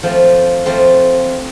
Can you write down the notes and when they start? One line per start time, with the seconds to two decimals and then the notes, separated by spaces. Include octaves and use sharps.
0.03 F3 A3 C4
0.66 F3 A3 C4